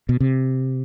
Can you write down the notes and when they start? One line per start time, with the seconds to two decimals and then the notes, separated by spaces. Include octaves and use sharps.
0.09 B2
0.20 C3